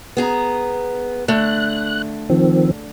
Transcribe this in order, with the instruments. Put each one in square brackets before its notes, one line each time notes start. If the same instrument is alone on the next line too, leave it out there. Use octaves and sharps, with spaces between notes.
[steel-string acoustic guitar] B3 G#4 A#5
[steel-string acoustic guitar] D3 A3 [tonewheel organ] F#6
[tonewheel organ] D#3 F3 C4